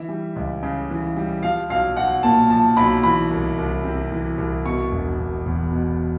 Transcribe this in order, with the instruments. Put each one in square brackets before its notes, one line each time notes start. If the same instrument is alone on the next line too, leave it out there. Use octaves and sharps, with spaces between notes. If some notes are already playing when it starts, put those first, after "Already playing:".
Already playing: [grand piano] E3 E5
G3
C#2
C#3
E3
G3
F3 F5
B1 F5
B1 F#5
A#2 A5
F3 A5
B1 B5
E3 B5
C2
C2
C3
E3
C2
B2 C#6
E1
E1
E2
B2